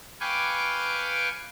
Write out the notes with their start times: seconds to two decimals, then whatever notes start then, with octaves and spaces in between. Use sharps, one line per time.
0.20 B4 F5 G5 G#5 C#6 D6